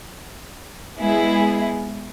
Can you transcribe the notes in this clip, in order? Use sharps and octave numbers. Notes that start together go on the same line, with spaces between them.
G#3 B3 E4 G#4